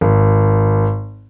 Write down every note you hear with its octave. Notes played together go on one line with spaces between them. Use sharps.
G#1